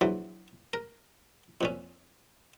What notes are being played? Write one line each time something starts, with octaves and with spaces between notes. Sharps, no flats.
A#1 E3 F#3
A#4
F2 A#2 C#4